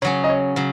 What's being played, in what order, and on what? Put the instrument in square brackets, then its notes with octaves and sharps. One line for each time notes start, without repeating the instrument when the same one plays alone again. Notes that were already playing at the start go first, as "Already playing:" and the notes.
[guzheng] C#3 F#3 C#4 [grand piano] C#5
[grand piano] D#5
C#5
[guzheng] C#3 F#3